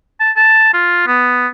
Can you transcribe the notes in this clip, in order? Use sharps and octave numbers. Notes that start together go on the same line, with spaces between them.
A5
A5
F4
B3